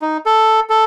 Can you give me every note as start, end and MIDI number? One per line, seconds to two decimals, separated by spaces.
0.02 0.17 63
0.26 0.60 69
0.69 0.85 69